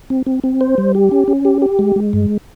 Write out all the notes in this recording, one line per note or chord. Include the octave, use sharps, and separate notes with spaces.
C4
C4
C4
C5
G3
G4
C#4
C#4
G4
G4
G#3
G#3
G2